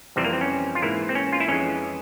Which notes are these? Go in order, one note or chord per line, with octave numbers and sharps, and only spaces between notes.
F2 C3 E3 G3 C4
A#3
C4
C#4
F4
G#2 E3 A#3 E4
C4
C#4
F4
E4
F2 E3 G#3 C#4